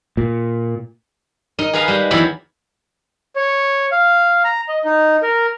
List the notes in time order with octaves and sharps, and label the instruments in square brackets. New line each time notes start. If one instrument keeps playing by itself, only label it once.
[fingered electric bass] A#2
[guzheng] D#4 A#4 D#5
G#4 B4 D#5 F5 G#5 A#5
G3 G#3
E2 F#3 A#3 E4 B5
[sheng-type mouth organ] C#5
F5
A#5
D#5
D#4
A#4